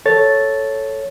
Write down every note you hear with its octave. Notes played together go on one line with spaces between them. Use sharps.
A4 C#5 A6